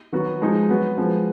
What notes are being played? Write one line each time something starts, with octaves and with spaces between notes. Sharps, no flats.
D#3 F#3 B3 F#4
F3 G#3 D#4
F#3 B3 F#4
F3 G#3 B3